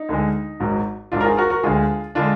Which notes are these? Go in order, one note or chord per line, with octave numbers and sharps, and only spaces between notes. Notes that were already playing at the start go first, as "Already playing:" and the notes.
Already playing: D#4
D2 D3 G#3
G#1 G#2 F#3
G#1 G#2 F#3 D4 F4
A#4
F4 G#4
F#4 A#4
F#4 A#4
D2 D3 G#3 F4 G#4
D3 G#3 D4 F4